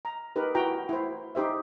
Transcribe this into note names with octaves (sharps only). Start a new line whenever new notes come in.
A#5
D#4 G4 A#4 B4
E4 F#4 G5 A#5
E4 C5
D#4 G4 C5 E5